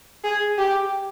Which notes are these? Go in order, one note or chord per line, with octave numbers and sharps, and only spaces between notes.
G#4
G4